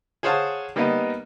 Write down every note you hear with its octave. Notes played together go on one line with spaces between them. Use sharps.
G#4 C5 C#5 F5 F#5 A5
G3 A#3 B3 D#4 D#5